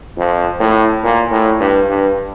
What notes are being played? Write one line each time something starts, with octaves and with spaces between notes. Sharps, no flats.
F2
A2
A#2
A2
G2
G2